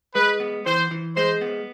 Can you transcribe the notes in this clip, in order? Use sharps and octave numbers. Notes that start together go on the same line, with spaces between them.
G#3 B4
B3
E3 C5
E3
G#3 C5
B3